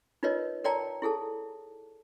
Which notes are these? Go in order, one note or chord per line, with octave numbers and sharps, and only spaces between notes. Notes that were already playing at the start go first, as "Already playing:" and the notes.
D#4 F4 A#4 B4 C#5 D#5
A#4 C#5 D5 G5 A5 A#5
E4 G#4 A4 A5